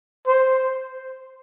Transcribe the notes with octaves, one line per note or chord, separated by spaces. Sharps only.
C5